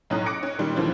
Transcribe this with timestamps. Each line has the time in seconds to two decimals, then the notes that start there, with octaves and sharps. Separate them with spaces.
0.10 B1 A2 C#4 A#5 D#6 F#6
0.26 D6 D#6 F#6 A#6 C#7 D7
0.43 C#4
0.59 A#2 D#3 G3 D#4
0.76 D#2 D3 E3 F3 C4 D4